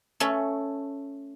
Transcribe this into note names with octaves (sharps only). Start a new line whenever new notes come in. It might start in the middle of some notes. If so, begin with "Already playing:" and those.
A3 C#4 A4